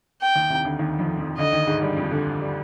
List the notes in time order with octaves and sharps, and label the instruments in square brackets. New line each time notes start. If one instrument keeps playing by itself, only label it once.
[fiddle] G5
[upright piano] D#2 D#3
C2 C3
D2 D3
D#2 D#3
F2 F3
F2 F3
[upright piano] D2 D3 [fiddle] D#5
[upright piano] D#2 D#3
G#2 G#3
G2 G3
F2 F3
D2 D3
G3